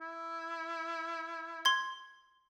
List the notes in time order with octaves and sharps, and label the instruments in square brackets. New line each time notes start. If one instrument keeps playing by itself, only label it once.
[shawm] E4
[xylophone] C6 G#6